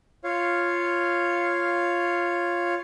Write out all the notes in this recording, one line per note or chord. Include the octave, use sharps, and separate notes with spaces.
F4 C#5 F5